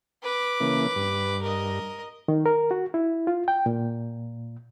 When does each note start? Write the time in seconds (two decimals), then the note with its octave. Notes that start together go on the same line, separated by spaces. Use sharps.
0.23 B4 D6
0.60 C#3 E3 A#3
0.96 G2
1.42 A#4 D#5
2.28 D#3
2.46 A#4
2.71 F#4
2.94 E4
3.27 F4
3.48 G5
3.66 A#2